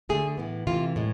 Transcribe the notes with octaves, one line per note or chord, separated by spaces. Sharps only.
D3 A3 G#4
A2 E3 B3
C3 E3 A3 F4
A2 G#3